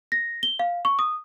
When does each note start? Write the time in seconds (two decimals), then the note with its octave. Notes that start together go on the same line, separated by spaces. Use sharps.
0.12 A#6
0.43 G7
0.59 F5
0.85 C#6
0.99 D#6